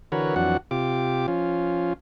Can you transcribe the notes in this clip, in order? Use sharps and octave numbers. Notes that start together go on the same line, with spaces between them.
D3 E3 F#4 A#4 B4 C#5
F2 E3 F#3 D4 F#4 F#5
C3 F4 G4 D6
F3 C#4 F4